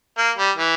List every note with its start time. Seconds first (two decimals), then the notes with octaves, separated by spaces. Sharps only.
0.17 A#3
0.37 G3
0.57 E3